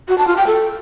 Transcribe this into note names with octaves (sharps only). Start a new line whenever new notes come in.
F#4
A5
F4
G5
A4